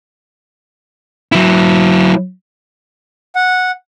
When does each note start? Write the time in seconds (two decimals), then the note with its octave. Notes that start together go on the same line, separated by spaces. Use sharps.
1.32 F#3 E4
3.35 F#5